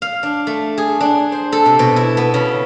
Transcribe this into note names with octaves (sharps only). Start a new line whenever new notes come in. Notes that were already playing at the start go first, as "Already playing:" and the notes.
F5
D4
A3
G#4
D4
C5
A4
C3
B2
E4
B3
C#3